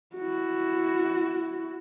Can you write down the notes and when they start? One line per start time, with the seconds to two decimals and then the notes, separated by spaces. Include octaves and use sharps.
0.16 E4 F#4